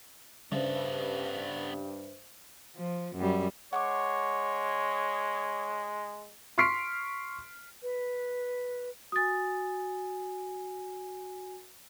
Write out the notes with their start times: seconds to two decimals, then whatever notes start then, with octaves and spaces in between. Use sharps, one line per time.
0.52 G2 C#3 B3 A4 C5 E5
2.76 F3
3.16 F#2 G3
3.73 G#3 C#5 F#5 C#6 D6
6.58 C6 C#6 F6 B6 C7 D7
7.83 B4
9.12 F#4 G#5 D#6 A6